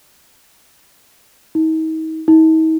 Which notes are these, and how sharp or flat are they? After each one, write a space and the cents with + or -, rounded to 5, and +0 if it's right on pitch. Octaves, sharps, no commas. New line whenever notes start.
D#4 +40
D#4 +45